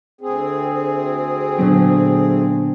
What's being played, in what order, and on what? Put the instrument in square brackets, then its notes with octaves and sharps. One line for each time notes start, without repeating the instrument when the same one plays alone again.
[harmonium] D2 C4 G#4
[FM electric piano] A#2 D3 F#3 [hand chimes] B3 D4 C5